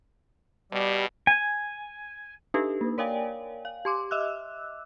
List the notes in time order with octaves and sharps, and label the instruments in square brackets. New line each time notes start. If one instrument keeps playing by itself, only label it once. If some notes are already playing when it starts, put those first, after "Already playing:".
[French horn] B2 [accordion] G3
[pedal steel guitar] G#5
[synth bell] D4 D#4 G4 A4 B4
A#3
A#4 C#5 D5 F5 G5 G#5
F5
G4 C6 D6
D#5 E5 D6 E6 F#6